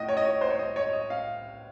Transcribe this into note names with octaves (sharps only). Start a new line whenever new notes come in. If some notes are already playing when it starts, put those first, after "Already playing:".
Already playing: A2 D#5
C#5
D#5
C#5
C5
C#5
D#5
C#5
D#5
F5